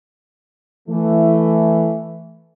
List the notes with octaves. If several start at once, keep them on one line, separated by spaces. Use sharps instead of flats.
E3 A3